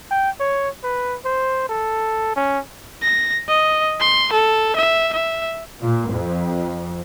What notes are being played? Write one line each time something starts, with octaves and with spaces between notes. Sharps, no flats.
G5
C#5
B4
C5
A4
C#4
A#6
D#5
C6
A4
E5
E5
A#2
F2